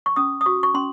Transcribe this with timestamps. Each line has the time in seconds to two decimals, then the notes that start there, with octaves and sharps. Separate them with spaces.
0.06 C#6
0.16 C#4 D#6
0.41 D#6
0.46 F#4 C#6
0.63 C#6
0.74 C#4 C6